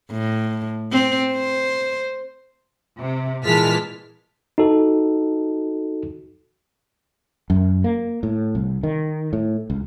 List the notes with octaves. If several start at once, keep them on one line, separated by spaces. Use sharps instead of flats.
A2
C4
C5
C3
A#2 E3 G#3 A5 F6 B6
D#4 F#4 A4
F#2
A#3
A2
C2
D#3
A2
C#2